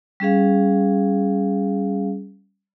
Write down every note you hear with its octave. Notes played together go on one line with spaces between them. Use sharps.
G3 C#4 G#4 F5